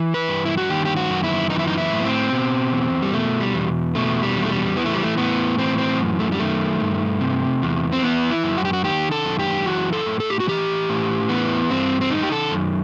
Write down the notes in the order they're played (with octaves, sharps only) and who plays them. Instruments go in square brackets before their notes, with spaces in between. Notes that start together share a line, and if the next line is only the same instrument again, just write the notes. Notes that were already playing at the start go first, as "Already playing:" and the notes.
Already playing: [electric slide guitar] E3
B4
G2
E4
F#4
D#3 G4
G4
F#4
F#2
E4
E3 D#4
E4
D#4
E4
A2
B3
C4
B2
E2
G3
B2 A3
G3
E2
B2 A3
G3
E2
A3
G3
E3 B3
A3
G3
A3
A2 B3
E3 C4
C4
F#2
A3
G3
D#3 A3
G2
C3
E2
C4
E3 B3
E4
F#2
F#4
G4
F#4
D#3 G4
A4
F#2
G4
E3 F#4
A4
A2
A4
G4
F#4
E3 G4
A2
E3 B3
G2 C4
C4
D#3 D#4
G4
A4
F#2